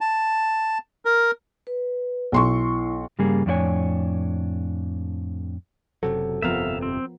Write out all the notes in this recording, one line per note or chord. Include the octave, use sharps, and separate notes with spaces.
A5
A#4
B4
B1 E4 C6 C#6
G2 C#3 G3 A#3 G#4
F2 A2 D4 E4 C#5 G#5
F#1 C3 F#3 A4
G1 F2 C3 F3 B3 A#4 E5 F5
C4